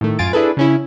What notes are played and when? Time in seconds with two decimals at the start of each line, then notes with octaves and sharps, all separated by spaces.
0.01 A2 D#3 A3
0.19 F#2 F4 G#5 A6 D7
0.33 D4 E4 G#4 A4 B4
0.57 C#3 C#4 E4